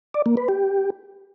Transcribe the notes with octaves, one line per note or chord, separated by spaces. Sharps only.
D5
A#3
B4
G4